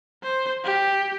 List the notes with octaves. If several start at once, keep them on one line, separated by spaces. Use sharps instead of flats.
C5
G4